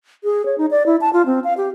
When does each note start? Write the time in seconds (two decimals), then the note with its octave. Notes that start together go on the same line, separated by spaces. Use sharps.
0.24 G#4
0.46 C#5
0.58 D#4
0.71 D5
0.86 E4
1.01 A5
1.13 F4
1.26 C4
1.44 F5
1.57 G4